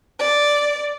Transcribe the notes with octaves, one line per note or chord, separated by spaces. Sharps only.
D5